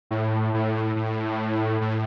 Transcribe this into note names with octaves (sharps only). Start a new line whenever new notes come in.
A2
A2
A2
A2